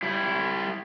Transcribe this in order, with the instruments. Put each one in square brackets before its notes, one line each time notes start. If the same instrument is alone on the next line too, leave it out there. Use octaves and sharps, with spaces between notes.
[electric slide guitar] G3 E4